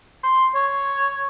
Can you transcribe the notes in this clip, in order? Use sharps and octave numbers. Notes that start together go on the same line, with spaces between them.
C6
C#5